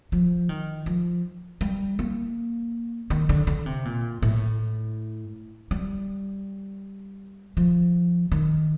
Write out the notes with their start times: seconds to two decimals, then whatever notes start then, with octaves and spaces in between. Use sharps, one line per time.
0.12 F3
0.49 D#3
0.86 F3
1.61 G3
1.99 A#3
3.10 D#3
3.29 D3
3.47 D3
3.66 C3
3.85 A#2
4.22 A2
5.71 G3
7.57 F3
8.32 D#3